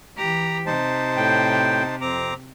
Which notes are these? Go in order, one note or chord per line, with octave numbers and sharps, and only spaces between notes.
E3 G4 A#5
C3 D#4 C5 A5
A2 G5
F2 C4 A#5 D6